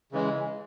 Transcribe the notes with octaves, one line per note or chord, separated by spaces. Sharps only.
C#3 E3 G#3